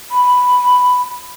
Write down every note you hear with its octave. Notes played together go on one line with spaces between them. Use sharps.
B5